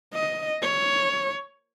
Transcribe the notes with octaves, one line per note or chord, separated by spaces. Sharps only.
D#5
C#5